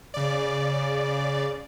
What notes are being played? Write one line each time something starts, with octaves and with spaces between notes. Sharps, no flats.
C#3 D5